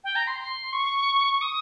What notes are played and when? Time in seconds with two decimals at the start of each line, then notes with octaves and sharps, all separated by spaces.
0.04 G5
0.16 A#5
0.27 C6
0.39 C6
0.73 C#6
1.42 D#6